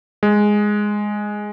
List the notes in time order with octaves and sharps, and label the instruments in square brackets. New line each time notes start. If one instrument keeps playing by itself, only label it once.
[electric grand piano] G#3